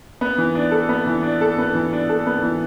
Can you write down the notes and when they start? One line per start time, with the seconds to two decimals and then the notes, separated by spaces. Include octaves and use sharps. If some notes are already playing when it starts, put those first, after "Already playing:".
0.21 B3
0.38 E3
0.55 D4
0.71 A4
0.89 B3
1.06 E3
1.23 D4
1.41 A4
1.58 B3
1.75 E3
1.93 D4
2.09 A4
2.27 B3
2.43 E3